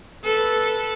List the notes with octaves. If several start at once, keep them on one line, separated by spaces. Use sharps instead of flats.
A4 B4